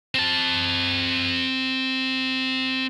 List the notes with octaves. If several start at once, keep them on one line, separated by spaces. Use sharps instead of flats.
C4 A5